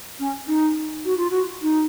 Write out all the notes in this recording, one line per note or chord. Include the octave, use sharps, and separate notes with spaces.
C#4
D#4
F#4
F4
F#4
D#4